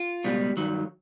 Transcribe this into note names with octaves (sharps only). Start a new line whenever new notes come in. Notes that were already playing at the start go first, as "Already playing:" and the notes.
Already playing: F4
C#2 B2 G3
G2 D#3 F#3